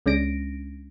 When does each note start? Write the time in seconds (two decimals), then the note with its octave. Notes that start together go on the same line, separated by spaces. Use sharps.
0.06 C#2 G#3 C#4 D4 A#6 D7